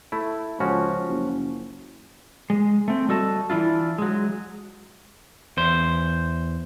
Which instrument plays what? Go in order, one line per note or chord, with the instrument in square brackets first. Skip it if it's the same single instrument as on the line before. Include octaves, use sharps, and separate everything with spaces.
[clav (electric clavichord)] A3 E4
[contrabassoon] C#2 [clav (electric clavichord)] F3 C#4 F#4
[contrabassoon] F#1
[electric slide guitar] G#3
A3 C4
G3 F#4 A4 D#5 A5
E3 D4 E4 F4
F#3 G#3
E2 C5